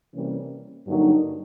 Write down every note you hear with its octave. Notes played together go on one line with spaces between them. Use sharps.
C3 E3 G3 A#3 C#4
G2 D3 F#3 A#3 D#4